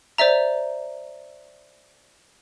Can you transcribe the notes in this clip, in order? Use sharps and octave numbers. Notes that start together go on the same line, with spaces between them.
C5 D5 E5 A#5